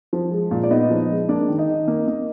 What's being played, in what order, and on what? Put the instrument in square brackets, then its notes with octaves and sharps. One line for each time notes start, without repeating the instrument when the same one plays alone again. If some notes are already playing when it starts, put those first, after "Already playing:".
[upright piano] F3
G#3
A#2
D5
B3 D#4 D#5
F3
G#3
A#3 D4 D5
D#3
D#4 D#5
D#3
A#3
A#3